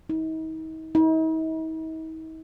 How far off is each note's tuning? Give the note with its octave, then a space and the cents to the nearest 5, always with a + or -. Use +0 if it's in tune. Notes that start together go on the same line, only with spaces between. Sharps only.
D#4 +40
D#4 +45